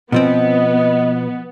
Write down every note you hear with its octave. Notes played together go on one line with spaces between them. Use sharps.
B2 F3 B3 C4 D#5